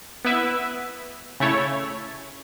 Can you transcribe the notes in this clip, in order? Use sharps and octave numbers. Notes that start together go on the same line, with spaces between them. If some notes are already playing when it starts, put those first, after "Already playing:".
B3 E4 B4 E5
C#3 A3 E4 A4 C#5